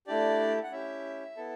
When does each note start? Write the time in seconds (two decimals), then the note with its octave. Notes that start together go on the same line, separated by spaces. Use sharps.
0.07 A3 D4 E4 G4 D5
0.63 F#5
0.72 C#4 E4 G4 E5
1.37 B3 E4 A4